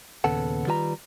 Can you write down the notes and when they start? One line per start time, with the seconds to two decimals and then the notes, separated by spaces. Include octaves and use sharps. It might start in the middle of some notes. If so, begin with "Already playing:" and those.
0.24 D#2 A#2 C#3 B3 A4 F#5
0.67 D#3 G3 F4 B4 G#5 A#5